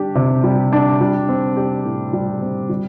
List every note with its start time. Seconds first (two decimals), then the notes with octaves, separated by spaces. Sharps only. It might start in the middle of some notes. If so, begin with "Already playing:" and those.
Already playing: G3 D4 G4
0.15 C3
0.44 G3
0.73 D4
1.01 G3
1.29 C4
1.57 G4
1.85 A2
2.13 G3
2.41 C4
2.69 G3